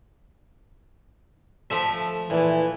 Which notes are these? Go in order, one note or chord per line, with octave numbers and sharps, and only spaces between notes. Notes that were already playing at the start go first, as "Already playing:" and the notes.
F3 A3 E5
A#2 E3